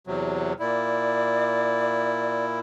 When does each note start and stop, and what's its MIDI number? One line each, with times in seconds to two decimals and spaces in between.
0.07 0.53 40
0.07 0.53 48
0.07 0.53 54
0.60 2.60 46
0.60 2.60 64
0.60 2.45 74